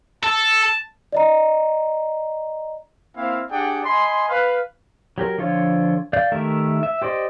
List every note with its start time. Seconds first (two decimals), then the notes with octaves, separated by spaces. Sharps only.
0.24 A4 A5
1.12 D5 D#5 A#5
3.16 A#3 C4 E4 F5
3.51 D4 G4 G#4 D5 F#5 G5
3.85 D#5 G#5 B5 C6
4.29 B4 F5
5.18 F#3 G4 A#4
5.38 D3 F3 F4 C#5
6.13 D5 F5 G6
6.31 D#3 A3 G4 A#4 E5
6.83 E5
7.02 G4 C5 D5 D#5